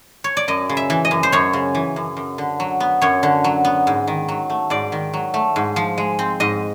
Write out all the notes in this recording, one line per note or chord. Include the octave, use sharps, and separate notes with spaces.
C#5
D5
F#2 D#5
C#3
E5
E3
D#5
F#2
C5
F#2 C#5
C#3
E3
F#2
F#2
D3
F#3
B3
F#2 C#5
D3
F#3
B3
G#2
D#3
F#3
A3
G#2 D5
D#3
F#3
A3
G#2
F3
G#3
C4
G#2 D#5